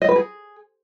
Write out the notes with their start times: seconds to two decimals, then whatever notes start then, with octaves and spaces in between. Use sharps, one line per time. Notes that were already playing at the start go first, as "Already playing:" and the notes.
0.02 D#5
0.09 B4
0.16 G#4